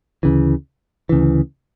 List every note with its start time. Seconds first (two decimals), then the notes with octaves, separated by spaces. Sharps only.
0.23 D2 C#3 E3
1.09 D2 C#3 E3